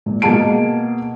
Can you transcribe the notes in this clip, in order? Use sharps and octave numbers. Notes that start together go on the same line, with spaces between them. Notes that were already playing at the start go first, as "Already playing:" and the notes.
A#2
B2 A#3 G#4 A5 D7